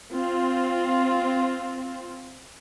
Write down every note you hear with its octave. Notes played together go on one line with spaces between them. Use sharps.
C4 F4